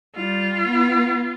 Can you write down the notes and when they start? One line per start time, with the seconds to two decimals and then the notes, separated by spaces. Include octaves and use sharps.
0.16 G3 F4
0.67 B3